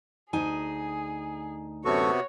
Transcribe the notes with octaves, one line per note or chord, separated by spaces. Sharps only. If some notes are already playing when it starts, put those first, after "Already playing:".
D2 D#4 G#4 G#5
F#2 C3 B3 F#4 A4 C#5 C#6